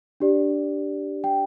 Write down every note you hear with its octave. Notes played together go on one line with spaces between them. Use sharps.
D4 G4 D5
G5